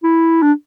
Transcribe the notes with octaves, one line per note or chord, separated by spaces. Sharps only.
E4
D4